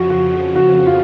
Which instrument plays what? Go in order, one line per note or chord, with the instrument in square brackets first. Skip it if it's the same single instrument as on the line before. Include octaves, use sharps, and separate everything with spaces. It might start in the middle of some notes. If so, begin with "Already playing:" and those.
Already playing: [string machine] F2 C#3 F3 [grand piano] F#4
[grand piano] F#4
F#4
F4